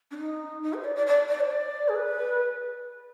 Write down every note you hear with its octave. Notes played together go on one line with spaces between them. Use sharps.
D4
D#4
D#4
C5
D5
D5
D5
D5
C5
D5
G#4
B4